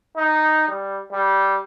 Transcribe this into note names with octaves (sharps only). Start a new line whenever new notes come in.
D#4
G3
G3